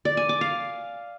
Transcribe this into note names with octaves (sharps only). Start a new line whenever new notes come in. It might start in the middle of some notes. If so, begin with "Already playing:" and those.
D5
G#5
D6
F5